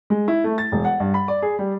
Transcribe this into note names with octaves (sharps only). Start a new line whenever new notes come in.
G#3
E4
A3
A6
E1
F#5
G2
B5
D5
G#4
G3